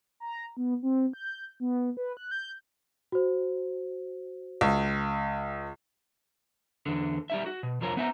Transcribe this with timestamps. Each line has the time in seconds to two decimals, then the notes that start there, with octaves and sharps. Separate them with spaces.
0.20 A#5
0.57 B3
0.83 C4
1.13 G6
1.60 B3
1.97 B4
2.17 F#6
2.31 G6
3.12 F#4 C5
4.61 C#2
6.86 E2 D3
7.30 G3 D#4 E5
7.46 F#4
7.63 B2
7.81 C2 F2 F3 A#4 C#5
7.97 B3 D#4 E5 A5 A#5